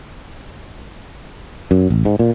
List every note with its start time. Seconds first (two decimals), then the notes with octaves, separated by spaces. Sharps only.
1.71 F#2
1.90 A1
2.05 G#2
2.19 A#2